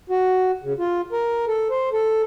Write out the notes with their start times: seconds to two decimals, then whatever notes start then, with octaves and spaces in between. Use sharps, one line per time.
0.10 F#4
0.63 C#3
0.79 F4
1.12 A#4
1.48 A4
1.70 C5
1.93 A4